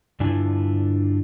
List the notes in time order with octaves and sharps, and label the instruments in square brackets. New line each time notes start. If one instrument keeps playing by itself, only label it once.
[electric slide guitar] G2 D3 D4 E4 F4 G#5